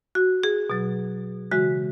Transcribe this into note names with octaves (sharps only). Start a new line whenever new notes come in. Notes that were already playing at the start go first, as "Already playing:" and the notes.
F#4
G#4
B2 F#3
C#3 E3 G#3 F#4